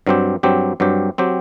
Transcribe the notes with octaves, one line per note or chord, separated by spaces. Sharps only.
G2 F#3 C4 G4
G2 F#3 C4 G4
G2 F#3 C4 G4
F#3 C4 G4